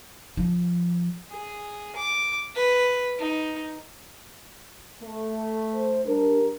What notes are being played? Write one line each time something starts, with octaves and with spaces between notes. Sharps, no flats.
F3
G#4
D6
B4
D#4
A3
C5
G3 D4 A#4